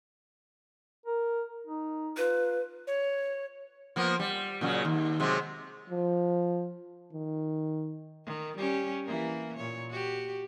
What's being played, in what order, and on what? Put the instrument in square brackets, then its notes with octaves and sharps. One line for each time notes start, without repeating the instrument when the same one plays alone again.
[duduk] A#4
D#4
[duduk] F4 [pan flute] B4
[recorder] C#5
[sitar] F3 A#3 B3
G3
A#2 C#3 F#3
D#2
C3 F#3 G#3
[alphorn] F3
D#3
[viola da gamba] D#3
G3 C#4 G4
E3 A#3 A#4
A#2 C#5
F#4 G4